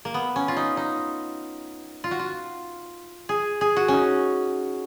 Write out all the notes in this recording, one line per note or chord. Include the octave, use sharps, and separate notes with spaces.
A#3
B3
C#4
F4
D#4
D#4
F4
F#4
F4
G#4
G#4
F#4
C#4 D#4